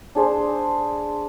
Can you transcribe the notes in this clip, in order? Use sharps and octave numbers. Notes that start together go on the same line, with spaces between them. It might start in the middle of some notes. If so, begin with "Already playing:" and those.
D4 G#4 C5